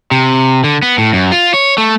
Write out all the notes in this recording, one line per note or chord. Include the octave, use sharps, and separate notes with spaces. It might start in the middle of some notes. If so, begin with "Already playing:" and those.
C3
D3
B3
A2
F#2
F4
C#5
A3